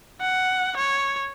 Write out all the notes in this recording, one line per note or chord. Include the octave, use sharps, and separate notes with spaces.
F#5
C#5